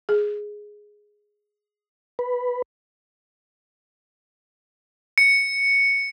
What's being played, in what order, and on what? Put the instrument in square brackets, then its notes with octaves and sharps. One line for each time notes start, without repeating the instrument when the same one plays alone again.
[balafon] G#4
[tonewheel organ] B4
[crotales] C#7